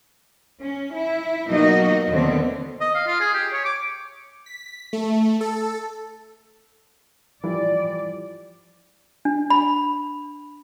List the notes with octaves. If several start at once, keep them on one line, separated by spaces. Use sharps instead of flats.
C#4
E4
B2 F#3 A#3 D#4 F#4 D#5
D#2 B2 D3 A3 B3 C4
D#5
F5
F4
G#4
G4
C#5
D6
B6
A3
A4
E3 F3 G3 D5
D4
B5